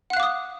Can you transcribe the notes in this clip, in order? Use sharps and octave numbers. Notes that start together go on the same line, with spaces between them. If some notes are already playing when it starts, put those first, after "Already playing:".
F5 F#5 D6 D#6 F#6